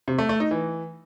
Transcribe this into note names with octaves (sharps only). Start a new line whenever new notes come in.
C3
A3
A3
D#4
E3